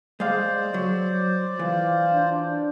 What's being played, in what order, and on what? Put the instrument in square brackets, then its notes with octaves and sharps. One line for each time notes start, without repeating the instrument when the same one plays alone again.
[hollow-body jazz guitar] G#3 F5 [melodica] C5 D5
[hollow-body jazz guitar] F#3
[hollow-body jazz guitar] E3 [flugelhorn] F4
[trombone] D4